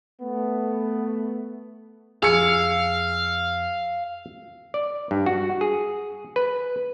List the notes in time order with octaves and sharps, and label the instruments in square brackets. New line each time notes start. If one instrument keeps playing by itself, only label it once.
[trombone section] A3 B3
[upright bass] F2 [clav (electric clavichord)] G#4 [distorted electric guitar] F5 [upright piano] E6 C#7
[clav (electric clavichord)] D5
G2
F#4
G#4
B4